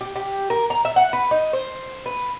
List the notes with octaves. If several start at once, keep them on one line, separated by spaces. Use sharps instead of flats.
G4
G4
A#4
A#5
E5
F#5
B4
D#4
C5
B4